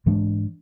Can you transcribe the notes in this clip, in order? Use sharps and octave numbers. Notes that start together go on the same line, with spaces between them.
G#2 E3 G#3 D4